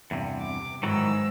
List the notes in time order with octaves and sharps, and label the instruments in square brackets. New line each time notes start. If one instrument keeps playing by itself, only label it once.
[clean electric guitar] E2 G2 C3
[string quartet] D6
[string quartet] G#2 E6 [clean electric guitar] D#3 E3 F#3